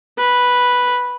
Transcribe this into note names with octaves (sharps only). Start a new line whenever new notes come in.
B4